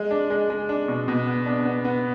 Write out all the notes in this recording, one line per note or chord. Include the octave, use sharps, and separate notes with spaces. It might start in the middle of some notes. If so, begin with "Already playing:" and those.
Already playing: G#3
D4
G#3
G#3
D4
B2
B2
B3
D4
B3
B3